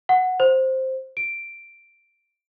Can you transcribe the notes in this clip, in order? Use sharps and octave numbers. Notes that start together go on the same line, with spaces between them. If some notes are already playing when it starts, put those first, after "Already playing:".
F#5
C5
D7